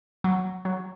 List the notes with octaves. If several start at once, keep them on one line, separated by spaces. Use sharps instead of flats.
F#3
F#3